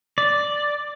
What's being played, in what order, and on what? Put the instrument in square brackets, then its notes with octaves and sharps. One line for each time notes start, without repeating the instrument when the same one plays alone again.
[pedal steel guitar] D5